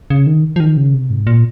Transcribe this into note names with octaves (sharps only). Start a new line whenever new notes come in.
C#3
D#3
F3
D#3
C#3
C3
G#2
A#2